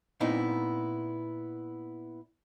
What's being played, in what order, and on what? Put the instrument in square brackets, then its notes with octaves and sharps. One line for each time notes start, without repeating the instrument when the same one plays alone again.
[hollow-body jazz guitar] A#2 B3 C4 D#4 E4